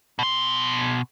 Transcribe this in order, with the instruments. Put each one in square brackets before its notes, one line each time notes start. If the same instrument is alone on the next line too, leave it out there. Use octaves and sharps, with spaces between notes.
[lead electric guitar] B2 C6